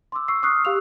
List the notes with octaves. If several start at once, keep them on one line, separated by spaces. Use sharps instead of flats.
C6 D6 E6
C#6 E6 C7
C#6 D#6 F6 F#6 C7
G4 F5 C#6 E6 F7